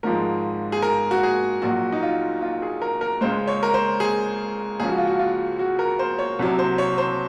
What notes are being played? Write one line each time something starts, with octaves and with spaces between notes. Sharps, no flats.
G#1 G#2 F3 G#3 A#4
G#4
A#4
F#4
G#4
A#1 A#2 F#3 F#4
D#4
F4
F4
G#4
A#4
A#4
C#2 C#3 G#3 C5
C#5
A#4
C5
G#4
C#2 C#3 F3 G#4
F#4
F4
F#4
F4
F#4
A#4
C5
C#5
C2 C3 F#3
C5
C#5
C5